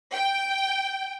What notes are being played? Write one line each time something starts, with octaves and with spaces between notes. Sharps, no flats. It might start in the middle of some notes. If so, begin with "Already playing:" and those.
G5